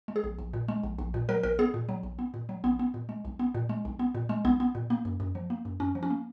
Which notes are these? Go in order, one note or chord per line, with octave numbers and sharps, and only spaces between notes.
G#3
G#4
A#1
A#1
A#2
G#3
A#1
A#1
A#2
F#3 A#4
A#1 A#4
B3 G#4
A#2
F#3
A#1
B3
A#2
F#3
A#1 B3
B3
A#2
G#3
B1
B3
A#2
G#3
B1
B3
A#2
G#3
B1 B3
B3
A#2
A#3
F#2
F#2
F3
A#3
F#2
F#2 C#4
F3
C#4
A#3